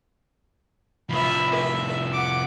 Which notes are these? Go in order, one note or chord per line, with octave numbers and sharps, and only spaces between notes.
C2 F3 E5 B5
E5
F#5 D6